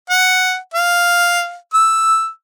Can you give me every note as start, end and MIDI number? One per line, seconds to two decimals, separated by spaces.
0.10 0.56 78
0.74 1.56 77
1.74 2.29 88